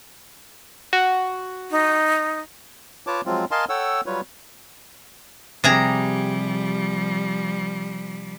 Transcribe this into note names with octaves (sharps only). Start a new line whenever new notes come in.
F#4
D#4
F4 B4 C#5 A5 D6
F3 F#3 G#3 C4 F4
A#4 D#5 F5 G#5 A5 C6
A4 C#5 F#5 G5 E6
F#3 G3 F4 B4 C#5
C3 F3 G3 G#4 A#5